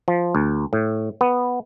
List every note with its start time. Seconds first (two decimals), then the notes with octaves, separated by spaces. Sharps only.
0.08 F3
0.35 D2
0.73 A2
1.21 B3